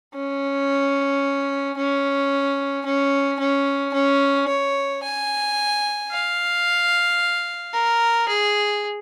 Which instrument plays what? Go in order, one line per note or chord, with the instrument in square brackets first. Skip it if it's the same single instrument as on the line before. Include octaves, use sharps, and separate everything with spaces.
[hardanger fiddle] C#4
C#4
C#4
C#4
C#4
C#5
G#5
F5
A#4
G#4